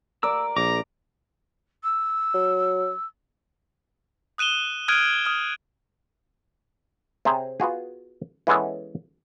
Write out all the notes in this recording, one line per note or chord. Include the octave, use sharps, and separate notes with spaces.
A#4 D5 E6
A#1 A#5 D6
E6
F#3
D#6 F#6 D#7 E7 G7
D#6 F6 F#6 G#6 D7 D#7
D#6 F6
C3 C4 G#4 C#5 A#5
B3 F4 F#4 G#4
E3 G#3 B3 C#4 A4